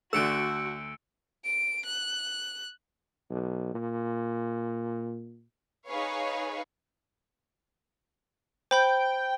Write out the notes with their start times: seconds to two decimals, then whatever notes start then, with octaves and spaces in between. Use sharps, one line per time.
0.13 D2 D3 A3 F#4 E6 C#7 D7
1.44 D7
1.85 F#6
3.30 B1
3.75 A#2
5.87 D#4 G#4 B4 C#5 F5
8.71 C5 G5 B5 G6